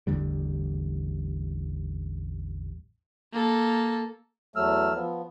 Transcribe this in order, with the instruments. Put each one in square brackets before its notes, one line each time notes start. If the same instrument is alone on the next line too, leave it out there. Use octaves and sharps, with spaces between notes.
[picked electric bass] A1 E2 D3 G3
[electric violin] A#3 A4
[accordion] E2 F#3 A3 E6 F6
F3 B3